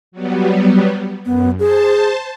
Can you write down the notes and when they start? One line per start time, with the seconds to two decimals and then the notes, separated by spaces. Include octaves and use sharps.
0.12 F#3 G3 B3
1.25 F#2 B3
1.59 G#4 C5 A5